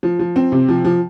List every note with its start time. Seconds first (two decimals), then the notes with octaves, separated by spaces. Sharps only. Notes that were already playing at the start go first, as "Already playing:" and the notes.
0.03 F3
0.19 F3
0.36 C4
0.52 C3
0.69 F3
0.85 F3